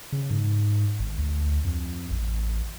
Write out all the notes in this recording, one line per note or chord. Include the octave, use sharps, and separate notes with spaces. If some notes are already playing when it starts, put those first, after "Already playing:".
C#3
G#2
G#1
D2
F2
A1